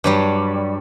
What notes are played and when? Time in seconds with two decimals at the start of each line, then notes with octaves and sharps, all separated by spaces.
0.04 G2 F#3 G3